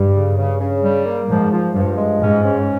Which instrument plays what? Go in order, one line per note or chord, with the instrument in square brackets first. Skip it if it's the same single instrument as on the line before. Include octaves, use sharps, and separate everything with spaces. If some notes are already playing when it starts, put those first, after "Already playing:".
Already playing: [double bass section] G2 [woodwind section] G3
[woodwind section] C#3
C#3
C#3
G3
A#3
[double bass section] G#2 [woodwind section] F3
[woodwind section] F3
[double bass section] G2 [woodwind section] F3
[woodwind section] G#3
[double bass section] G#2 [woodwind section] C#4
[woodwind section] C#4